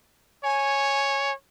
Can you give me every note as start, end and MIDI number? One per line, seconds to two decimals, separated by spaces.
0.44 1.34 73
0.44 1.32 80